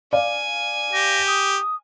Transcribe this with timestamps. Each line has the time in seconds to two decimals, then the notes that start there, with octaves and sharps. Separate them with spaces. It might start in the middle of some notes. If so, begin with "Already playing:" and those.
0.13 D5 F5 G#5
0.93 G4 A#6
1.27 D#6